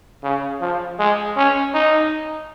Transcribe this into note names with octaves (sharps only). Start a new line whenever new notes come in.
C#3
F3
G#3
C#4
D#4